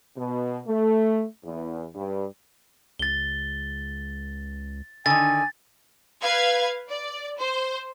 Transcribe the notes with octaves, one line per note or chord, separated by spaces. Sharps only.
B2
A3
E2
G2
C#2 A6 G7
D3 D#3 G#5 A6
B4 F5 G#6
D5
C5